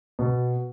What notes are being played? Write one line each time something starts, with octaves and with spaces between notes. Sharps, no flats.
B2